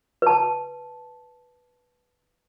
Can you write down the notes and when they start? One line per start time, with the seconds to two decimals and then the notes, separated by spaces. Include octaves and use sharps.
0.22 B4 A5